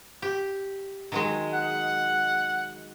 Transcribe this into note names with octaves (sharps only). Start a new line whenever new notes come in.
G4
D#3 F#3 G#3
F#5